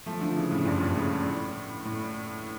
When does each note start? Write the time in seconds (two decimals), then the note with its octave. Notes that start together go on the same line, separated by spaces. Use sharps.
0.06 F3 A3
0.21 D3 F3
0.36 C#3 E3
0.50 A2 C#3
0.65 G2 A#2
0.80 G2 A#2
0.96 A2 C#3
1.25 A2
1.85 A2